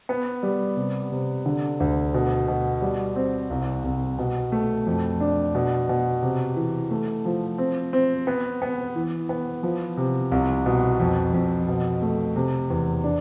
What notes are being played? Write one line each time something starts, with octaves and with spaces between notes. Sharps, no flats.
B3
G3
C3
C3
D3
D2
B2
B2
G3
C4
C2
C2
B2
A3
F2
D4
B2
B2
C3
E3
A3
F3
C4
C4
B3
B3
E3
B3
F3
C3
C2
B2
F2
F2
B2
A3
C3
E2
D4